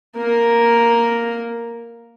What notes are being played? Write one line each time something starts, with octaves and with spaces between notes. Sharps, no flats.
A#3 A#4